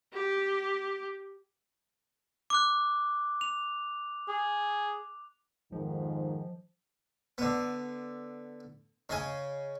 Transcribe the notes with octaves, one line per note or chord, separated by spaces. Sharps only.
G4
D6 F#6
F7
G#4
F2 G#2 D#3 F3
D3 B3
C#3 D#5 G#5